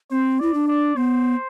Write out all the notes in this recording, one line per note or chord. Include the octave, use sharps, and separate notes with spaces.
C4 C5
E4 D5
D4
D5
B3 C5